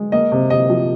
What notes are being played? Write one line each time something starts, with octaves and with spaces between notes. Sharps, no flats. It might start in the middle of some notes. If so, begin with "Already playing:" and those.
Already playing: G#3
A#3 D#5
C3
C3 D#5
F3